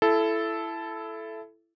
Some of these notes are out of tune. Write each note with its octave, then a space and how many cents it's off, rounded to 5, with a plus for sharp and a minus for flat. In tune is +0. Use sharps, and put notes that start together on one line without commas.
E4 +20 A4 -10